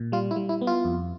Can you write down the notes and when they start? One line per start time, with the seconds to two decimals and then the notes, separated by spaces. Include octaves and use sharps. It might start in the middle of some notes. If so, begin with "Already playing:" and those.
Already playing: A#2
0.12 G3 F4
0.31 E4
0.36 G3
0.49 E4
0.61 B3
0.67 F4
0.85 F2